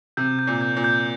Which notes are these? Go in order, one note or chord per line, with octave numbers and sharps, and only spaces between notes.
C3 G6
G6
A#2
G6
A#2
G6